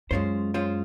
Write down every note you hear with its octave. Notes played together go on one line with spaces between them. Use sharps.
F#2 G#3 C#4 F4 C5
G#3 C#4 F4 C5